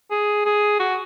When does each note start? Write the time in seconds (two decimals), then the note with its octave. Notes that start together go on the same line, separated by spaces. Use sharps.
0.11 G#4
0.45 G#4
0.80 F#4